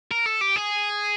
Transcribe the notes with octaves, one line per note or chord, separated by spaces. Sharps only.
A#4
A4
G4
G#4